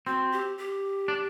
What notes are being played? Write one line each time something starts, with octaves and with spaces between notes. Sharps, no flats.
C4 F#4
G4
G4
D4